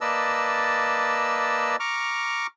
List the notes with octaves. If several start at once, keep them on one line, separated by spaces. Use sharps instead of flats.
A#3 B4 D5 D#5 A5 E6
A#5 C#6 D6 F6